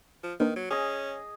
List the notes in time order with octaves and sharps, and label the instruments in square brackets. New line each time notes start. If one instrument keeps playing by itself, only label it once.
[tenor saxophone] F3
[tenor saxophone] D#3 [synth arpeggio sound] A#3 D4 B4
[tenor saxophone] F#3
[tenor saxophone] C#4 [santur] G#4 D#5